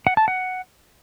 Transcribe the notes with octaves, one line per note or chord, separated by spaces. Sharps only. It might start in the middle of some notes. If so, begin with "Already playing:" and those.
F#5
A5
F#5